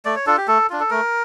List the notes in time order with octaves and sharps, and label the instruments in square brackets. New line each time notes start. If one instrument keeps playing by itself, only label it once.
[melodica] A3 D5
C#5
D4 F4 A4
G4
A3 A4
D4 F4
A4
A3 A#4